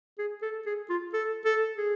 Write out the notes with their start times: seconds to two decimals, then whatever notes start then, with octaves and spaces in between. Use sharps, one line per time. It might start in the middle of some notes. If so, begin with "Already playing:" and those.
0.18 G#4
0.42 A4
0.66 G#4
0.90 F4
1.14 A4
1.45 A4
1.77 G#4